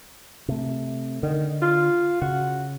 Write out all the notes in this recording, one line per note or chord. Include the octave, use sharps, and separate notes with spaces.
C3 A3
D3 D#3
F4
C#3 F#4